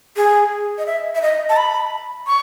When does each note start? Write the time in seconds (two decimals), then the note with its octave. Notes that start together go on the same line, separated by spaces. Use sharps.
0.16 G#4
0.78 D#5
0.86 E5
1.15 E5
1.22 D#5
1.49 A5
1.57 B5
2.27 C#6